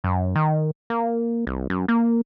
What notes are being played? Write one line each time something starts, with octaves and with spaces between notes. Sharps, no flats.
F#2
D#3
A#3
C2
F#2
A#3